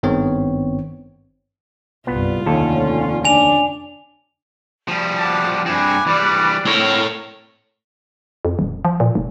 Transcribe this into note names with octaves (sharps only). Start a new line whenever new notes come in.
G#1 G2 D#3 B3 C4 C#5
C2 G2 B3 F4
F1 D#2 D3 C#4 A4
D4 G#5 F7
F3 G3
F#5 A5 D6 F#6
G2 C4 G#5 B5 D6 F#6
E3 G3 D5
A2 C4 A#4 C#5
F2
D#1
F3
A#2
F1